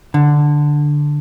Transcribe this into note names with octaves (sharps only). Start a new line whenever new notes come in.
D3